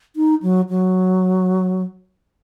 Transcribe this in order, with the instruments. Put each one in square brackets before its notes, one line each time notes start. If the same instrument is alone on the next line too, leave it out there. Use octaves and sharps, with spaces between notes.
[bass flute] D#4
F#3
F#3